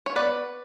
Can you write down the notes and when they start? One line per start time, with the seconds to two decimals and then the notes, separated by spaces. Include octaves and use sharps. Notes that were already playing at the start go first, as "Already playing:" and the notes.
0.06 C#5
0.15 B3 B4 D5